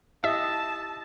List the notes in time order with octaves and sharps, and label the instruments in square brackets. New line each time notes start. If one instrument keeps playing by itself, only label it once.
[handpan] E4 G4 D#5 [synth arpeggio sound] E5 [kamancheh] A5 [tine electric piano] E6